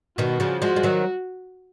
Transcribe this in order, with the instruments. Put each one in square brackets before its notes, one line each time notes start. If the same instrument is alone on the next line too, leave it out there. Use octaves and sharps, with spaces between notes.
[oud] B2 D#3 [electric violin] F#4
[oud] C#3 F3
[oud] F3 G#3 [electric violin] F#4
[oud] G#3
D#3 F#3